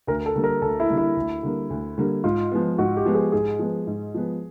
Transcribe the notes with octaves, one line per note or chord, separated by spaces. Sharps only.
D2 A#4
A4
D3 G3 A#3
A#4
D2 A4
E4
D3 G3 A#3
E4
D2
D3 G3 A#3
D2
D3 G3 A#3
G#2 F4
F3 G#3 B3
G#2 F#4
G4
F3 G#3 B3
G#4
G#2 G#4
F3 G#3 B3
G#2
F3 G#3 B3